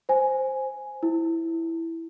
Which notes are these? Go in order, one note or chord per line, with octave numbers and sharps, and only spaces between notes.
C5 G#5
E4